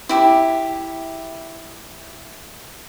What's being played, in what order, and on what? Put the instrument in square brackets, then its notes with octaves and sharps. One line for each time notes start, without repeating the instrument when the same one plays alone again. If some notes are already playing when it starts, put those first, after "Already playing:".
[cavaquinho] E4 G4 E5